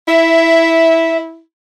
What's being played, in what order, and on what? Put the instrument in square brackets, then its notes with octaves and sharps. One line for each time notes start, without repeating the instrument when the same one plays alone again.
[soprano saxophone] E4 [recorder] E5